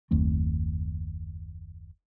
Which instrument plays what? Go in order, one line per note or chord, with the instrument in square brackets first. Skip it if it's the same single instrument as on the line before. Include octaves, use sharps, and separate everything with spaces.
[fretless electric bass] F#1 D#2 A3 C4